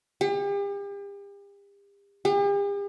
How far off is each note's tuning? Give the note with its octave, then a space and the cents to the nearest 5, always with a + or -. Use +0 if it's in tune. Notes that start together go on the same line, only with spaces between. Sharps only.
G4 +40
G4 +45